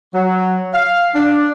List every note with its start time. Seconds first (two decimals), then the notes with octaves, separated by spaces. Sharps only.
0.14 F#3
0.73 F5
1.13 D4